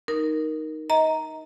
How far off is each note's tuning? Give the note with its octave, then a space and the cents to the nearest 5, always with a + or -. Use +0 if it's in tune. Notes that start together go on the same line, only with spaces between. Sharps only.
D#4 +0 A#4 +5
D#5 +25 A#5 +0